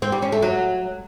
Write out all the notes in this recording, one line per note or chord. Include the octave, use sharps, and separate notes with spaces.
C4
G3
C#4
A3
F#3